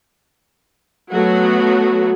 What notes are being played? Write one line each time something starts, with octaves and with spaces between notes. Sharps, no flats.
F#3 A3 B3 F#4